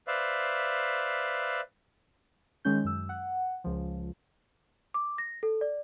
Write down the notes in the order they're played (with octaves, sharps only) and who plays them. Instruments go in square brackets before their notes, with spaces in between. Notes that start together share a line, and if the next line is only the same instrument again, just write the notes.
[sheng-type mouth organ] B4 C5 D5 E5 F5
[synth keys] D#3 G#3 C#4 G6
F#2 E6
F#5
C#2 F3
[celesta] D6
A#6
A4
D5